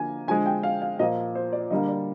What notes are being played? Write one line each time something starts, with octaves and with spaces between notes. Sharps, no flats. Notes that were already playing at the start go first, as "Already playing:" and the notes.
Already playing: D3 F3 A#3 G#5
D3 F3 G#3 G#5
G5
F5
F5
A#2 F3 A#3 D#5
C5
D5
D3 G3 A#3 D#5
D5